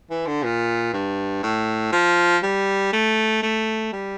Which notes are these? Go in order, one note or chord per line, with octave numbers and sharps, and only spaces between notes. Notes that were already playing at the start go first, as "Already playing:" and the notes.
E3
D3
A#2
G2
A2
F3
G3
A3
A3
G3